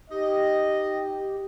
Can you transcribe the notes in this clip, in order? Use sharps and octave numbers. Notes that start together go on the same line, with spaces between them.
D#4 G4 D#5